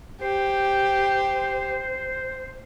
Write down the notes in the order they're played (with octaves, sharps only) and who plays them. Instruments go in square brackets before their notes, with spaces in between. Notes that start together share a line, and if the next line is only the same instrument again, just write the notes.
[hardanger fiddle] G4 [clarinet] C5